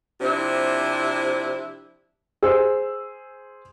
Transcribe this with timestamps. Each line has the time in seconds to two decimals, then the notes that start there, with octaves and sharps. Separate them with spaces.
0.21 C3 F3 C4 D4 E4
2.43 G#4 C5 E6